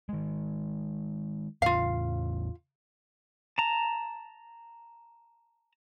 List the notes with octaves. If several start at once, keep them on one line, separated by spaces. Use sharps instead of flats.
D#3 G#3
E2 A2 C#3 F4 F5
A5 A#5